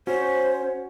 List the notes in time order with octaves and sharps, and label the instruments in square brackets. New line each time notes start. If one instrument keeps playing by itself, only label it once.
[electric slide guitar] C#4 [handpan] F#4 [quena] C5